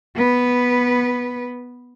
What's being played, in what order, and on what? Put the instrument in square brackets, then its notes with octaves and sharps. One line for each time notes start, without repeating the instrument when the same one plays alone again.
[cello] B3 B4